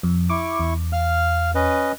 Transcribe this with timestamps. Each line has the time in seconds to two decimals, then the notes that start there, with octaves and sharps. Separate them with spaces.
0.03 F2
0.30 E4 C#6 D6
0.59 E2
0.93 F5 F6
1.55 C#4 B4 D#5